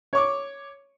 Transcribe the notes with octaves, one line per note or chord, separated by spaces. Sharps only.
C#5 C#6 D6